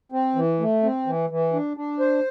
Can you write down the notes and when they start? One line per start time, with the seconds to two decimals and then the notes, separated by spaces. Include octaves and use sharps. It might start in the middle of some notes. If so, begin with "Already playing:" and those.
0.12 C4
0.35 E3
0.59 A3
0.83 C4
1.07 E3
1.30 E3
1.53 D4
1.77 D4
2.00 C5